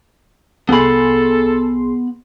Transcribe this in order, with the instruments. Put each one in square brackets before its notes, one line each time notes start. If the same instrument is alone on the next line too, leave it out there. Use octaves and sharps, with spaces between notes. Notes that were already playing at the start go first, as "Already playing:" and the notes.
[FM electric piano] C2 G#4 C6 [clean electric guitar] B3 B5 [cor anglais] A4